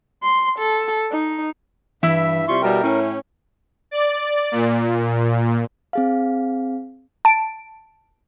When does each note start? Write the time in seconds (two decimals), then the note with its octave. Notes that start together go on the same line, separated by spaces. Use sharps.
0.23 C6
0.59 A4
1.12 D#4
2.03 G2 E3 E4 E5
2.48 C3 G3 F4 C6 C#6
2.62 B2 G3 A#4 G5
2.82 A2 C#4
3.91 D5
4.52 A#2
5.93 C4 G#4 F5
7.25 A5 D7